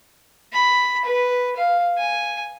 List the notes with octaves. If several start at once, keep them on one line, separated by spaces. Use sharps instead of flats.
B5
B4
F5
G#5